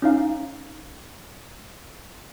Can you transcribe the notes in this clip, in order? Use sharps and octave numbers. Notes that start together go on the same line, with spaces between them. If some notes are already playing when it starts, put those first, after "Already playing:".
C#4 D#4 F5